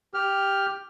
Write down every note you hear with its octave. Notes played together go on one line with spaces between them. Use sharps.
G4 F6